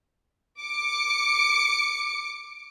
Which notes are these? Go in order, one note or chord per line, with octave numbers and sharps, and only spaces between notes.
D6 C#7